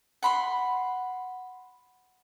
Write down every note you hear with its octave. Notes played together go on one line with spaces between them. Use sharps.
F#5 B5 C6